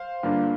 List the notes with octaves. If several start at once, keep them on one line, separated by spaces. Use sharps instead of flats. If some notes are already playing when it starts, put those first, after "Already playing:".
Already playing: C5 F5
G2 D3 A#3 D4 F4